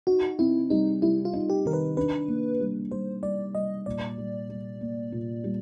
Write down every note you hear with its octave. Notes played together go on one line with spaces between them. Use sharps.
D#4 F#4
C4 E4
G3 D#4
G3 E4
F4
D#4
G4
D#3 A#4
B4
D4 B4
A#3
G3
G3 C5
G3 D5
G3 D#5
A#2 D5
G3
G3
A#3
A#2
G3